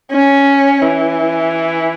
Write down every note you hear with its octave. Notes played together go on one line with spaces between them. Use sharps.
C#4
E3